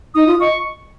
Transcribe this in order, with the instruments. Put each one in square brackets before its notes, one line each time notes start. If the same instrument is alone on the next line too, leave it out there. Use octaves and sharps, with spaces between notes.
[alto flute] D#4 [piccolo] D#6
[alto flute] F4
[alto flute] D#5 [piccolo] C#6